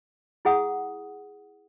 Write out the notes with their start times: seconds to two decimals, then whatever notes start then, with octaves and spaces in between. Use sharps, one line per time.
0.45 E4 G#4 F#5 D#6